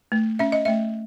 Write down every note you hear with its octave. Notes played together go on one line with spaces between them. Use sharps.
A3
C#4 E5
D#5
A3 E5